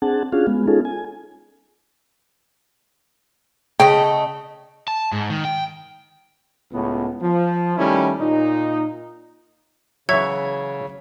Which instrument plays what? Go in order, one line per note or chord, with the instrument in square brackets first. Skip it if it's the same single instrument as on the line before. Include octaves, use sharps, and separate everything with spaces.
[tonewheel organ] C4 D4 G#4 F#5 A5
C#4 D4 F4 F#4 G#4 F5
G#3 B3
C#4 D#4 F4 G#4 A4
G#5
[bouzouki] C#3 A3 D#5 [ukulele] G5
[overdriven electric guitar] A5
G#2
D#3
G5
[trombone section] C#2 A2 B3
F3
D#3 G3 A3 C#4 E4
A#2 D#4
[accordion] C#3 [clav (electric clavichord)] E3 F#3 [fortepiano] C#5 E5 [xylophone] G#6